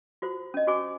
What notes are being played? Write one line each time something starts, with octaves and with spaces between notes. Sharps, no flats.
F4 F#4 C5
C#4 D#5
F#4 C5 G#5 D6